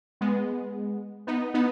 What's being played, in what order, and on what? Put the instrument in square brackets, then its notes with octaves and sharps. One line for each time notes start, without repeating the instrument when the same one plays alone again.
[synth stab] G#3 B3
B3 D#4
B3 D#4